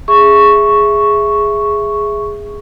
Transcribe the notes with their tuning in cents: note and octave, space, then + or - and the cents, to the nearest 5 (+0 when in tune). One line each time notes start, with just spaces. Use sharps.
G#4 +0 E5 +5 C#6 +0